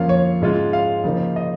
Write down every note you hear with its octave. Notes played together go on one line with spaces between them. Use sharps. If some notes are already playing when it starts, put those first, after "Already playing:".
Already playing: F2 F3 A#3 C#4 F4 F5
C#5
G#2 G#3 C#4 F4
F5
C#3 F3 A#3 D#4
D#5